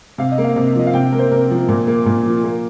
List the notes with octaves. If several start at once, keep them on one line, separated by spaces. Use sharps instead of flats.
C3 F5
D#5
A#3
F5
C3
F3 D#5
F5
C3 G5
A#3 A#4
C5
C3 A#4
F3
A#2
A#3
A#2
F3
A#3